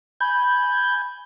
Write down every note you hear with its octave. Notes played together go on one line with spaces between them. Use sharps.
G#5 B5 G6